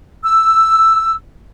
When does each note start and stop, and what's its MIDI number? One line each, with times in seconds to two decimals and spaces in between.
0.23 1.13 88